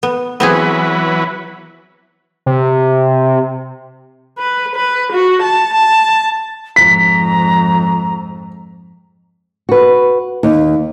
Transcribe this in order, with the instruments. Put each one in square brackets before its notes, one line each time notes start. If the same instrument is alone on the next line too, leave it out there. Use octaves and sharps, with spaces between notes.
[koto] B3
[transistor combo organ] E3 F#3 B4 [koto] B3 C4 G#4
[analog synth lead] C3
[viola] B4
B4
F#4
A5
A5
[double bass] F2 G#2 [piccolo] A#5 [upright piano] B6
[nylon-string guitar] F#4 B4
D#2